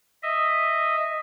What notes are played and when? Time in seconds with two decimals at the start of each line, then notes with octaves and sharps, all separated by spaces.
0.22 D#5 E5